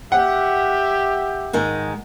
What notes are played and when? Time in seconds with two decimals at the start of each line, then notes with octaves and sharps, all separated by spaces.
0.12 G4 E5 F#5
1.53 G#2 D#3 G#3